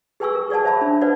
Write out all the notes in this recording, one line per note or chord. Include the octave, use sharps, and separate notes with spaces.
G#4 B4 G5 G#5 C#6 E6
A#4
G#4 D5 F#5 G#5 A5
C5 E5 A5 B5
D4
B4 C5 D5 F#5